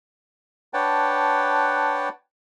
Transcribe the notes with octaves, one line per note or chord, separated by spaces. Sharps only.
D4 B4 C#5 F#5 G5 A5